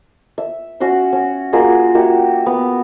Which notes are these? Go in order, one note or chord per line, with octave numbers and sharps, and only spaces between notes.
E5
C#4 F#4 F#5 C6
C#4
A#3 F4 F#4 G#4
A#3 F#4 G4 E5
B3